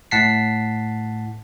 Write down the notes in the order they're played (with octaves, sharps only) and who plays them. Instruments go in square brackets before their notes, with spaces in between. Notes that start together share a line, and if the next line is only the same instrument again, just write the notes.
[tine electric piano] A2 F#5 A5 B6 C7